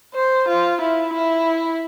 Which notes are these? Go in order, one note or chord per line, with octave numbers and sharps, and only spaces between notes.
C5
F4
E4
E4